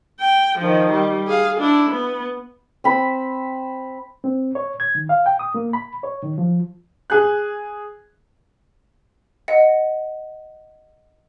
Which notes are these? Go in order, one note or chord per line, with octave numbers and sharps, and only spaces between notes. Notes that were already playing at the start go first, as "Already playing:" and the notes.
G5
D#3 F3
G3
G#4 F5
D4 E4
B3
C4 B5
C4
C#5
G#6
D#3
F5
G5
D#6
A#3
B5
C#5
D#3
F3
G#4 F#6
D#5 F#5